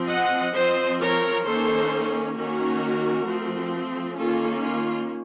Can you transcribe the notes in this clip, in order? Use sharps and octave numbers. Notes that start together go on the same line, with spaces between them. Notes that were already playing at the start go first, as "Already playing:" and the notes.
Already playing: F3 C4
D#5 F#5
F3 C4 C5 D#5
A#4 C#5
D#3 A#3 C#4 A4 C5
D#3 A#3 C#4 F#4 A#4
F3 A3 C4
D#3 A#3 C#4 F4 A4
F4